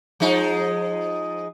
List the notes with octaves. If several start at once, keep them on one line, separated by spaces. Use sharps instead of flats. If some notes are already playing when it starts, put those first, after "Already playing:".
F3 G#3 D#4